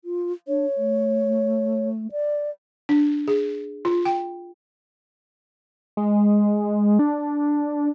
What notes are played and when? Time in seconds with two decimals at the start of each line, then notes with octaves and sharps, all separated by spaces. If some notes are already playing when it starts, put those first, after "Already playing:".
0.05 F4
0.48 D4 C#5
0.77 A3
2.12 D5
2.89 D4
3.28 G#4
3.85 F4
4.05 G5
5.97 G#3
6.99 D4